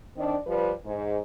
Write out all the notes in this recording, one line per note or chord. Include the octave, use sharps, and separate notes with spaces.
D#3 C4 D4 D5
F3 G3 B4 D5
G#2